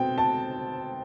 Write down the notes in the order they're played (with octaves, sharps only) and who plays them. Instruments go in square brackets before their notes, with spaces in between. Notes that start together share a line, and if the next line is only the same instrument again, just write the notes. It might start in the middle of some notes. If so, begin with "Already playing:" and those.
Already playing: [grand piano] B2 C4 [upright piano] G5
[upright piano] A5